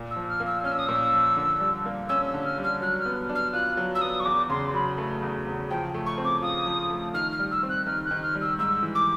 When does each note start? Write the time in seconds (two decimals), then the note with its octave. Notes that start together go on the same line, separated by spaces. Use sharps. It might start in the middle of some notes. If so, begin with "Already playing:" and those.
Already playing: A#2
0.11 E6
0.16 F3
0.29 F6
0.40 A#3
0.46 E6
0.64 C#4 F6
0.72 E6
0.79 D#6
0.86 A#2 E6
1.13 F3
1.37 D3
1.60 G3
1.86 A#3
2.09 C#4 E6
2.27 E6
2.34 D3
2.45 F6
2.58 G3
2.64 F6
2.81 F#3 F#6
2.99 F6
3.05 B3
3.29 D4
3.35 F6
3.53 F4 F#6
3.77 F#3
3.95 E6
4.01 B3 D#6
4.20 C#6
4.25 E2 D6
4.50 C#3 C6
4.74 F#3 B5
4.98 A3
5.23 E2
5.47 C#3
5.70 F3 G5
5.94 A3
6.06 C#6
6.18 C4
6.25 D6
6.42 F4 D#6
6.67 F3
6.90 A3
7.14 D#3 F6
7.32 F6
7.39 G3
7.51 E6
7.63 C4
7.69 F#6
7.87 D#3 F6
8.05 F#6
8.11 D#3
8.23 F6
8.35 G3
8.41 E6
8.59 G#2 E6
8.83 E3
8.95 D6